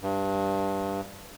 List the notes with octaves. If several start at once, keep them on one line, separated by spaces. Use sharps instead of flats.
G2